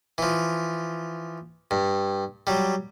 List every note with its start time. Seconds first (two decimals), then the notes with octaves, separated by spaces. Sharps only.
0.18 E3 F3
1.71 G2
2.47 F#3 G3